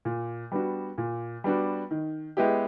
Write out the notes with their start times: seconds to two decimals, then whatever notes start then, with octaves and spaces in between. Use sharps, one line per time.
0.05 A#2
0.52 G3 B3 D4 F#4
0.98 A#2
1.44 G3 B3 D4 F#4
1.91 D#3
2.37 G#3 B3 E4 G4